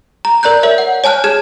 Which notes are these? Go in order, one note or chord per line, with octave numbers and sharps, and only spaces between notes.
A#5
A#4 D5 A#5 F#6 G6
A#4 C#5 E5
F#5
C#5 G#5 A5 F6 F#6
G#4 A5 F6 G#6